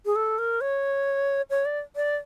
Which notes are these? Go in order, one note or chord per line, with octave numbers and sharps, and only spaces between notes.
G#4
A4
A#4
C#5
C#5
D5
D5